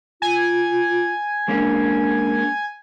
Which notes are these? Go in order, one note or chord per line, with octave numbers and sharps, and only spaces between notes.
F4 G#5
G#3 A#3 C#4 D4